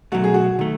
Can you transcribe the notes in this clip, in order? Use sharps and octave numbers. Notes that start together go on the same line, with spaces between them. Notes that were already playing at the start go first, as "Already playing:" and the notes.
B2 F#3 A3 F#4
G#4
F#4
D#3 A3